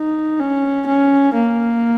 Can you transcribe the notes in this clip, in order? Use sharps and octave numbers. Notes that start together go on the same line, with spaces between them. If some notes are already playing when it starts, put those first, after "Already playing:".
Already playing: D#4
C#4
C#4
A#3